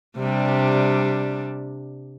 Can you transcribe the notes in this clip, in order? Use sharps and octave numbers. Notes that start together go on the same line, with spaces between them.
C3 G3 D4